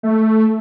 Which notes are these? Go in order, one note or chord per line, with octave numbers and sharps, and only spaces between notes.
A3